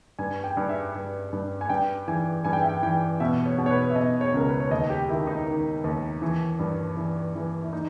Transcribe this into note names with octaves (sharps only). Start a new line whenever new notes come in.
G2 G#5
G5
G2
E5
G2
G2
G#5
G2 G5
E3 G#5
G2 G#5
G5
E5
G5
E3 G5
B2 E5
C#5
B2
C#5
B4
E5
B2 D#5
C#5
C#2 A#4
B4
C#5
D#2 D#5
G4
D#3 E4
D#4
D#3
D#2
E3
G2
E3
E3
E4
D#4